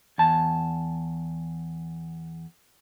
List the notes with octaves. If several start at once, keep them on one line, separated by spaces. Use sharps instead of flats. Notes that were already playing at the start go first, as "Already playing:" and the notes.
E2 A5